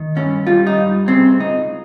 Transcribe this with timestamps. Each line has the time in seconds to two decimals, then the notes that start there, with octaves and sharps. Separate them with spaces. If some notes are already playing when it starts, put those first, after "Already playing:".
Already playing: D#3
0.16 G2 C#4
0.47 G3 F4
0.67 D#4
0.77 G2
1.08 C#3 C4
1.39 C#2 D#4